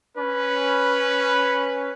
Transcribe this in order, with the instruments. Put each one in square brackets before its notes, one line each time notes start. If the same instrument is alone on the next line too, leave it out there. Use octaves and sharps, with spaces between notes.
[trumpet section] C#4 B4